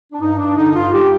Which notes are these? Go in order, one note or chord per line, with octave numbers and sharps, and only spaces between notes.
D4
G2 D#4
G2 D4
D3 D#4
G2 F4
G3 G4